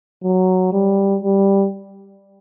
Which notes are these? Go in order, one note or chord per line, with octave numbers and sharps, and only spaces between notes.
F#3
G3
G3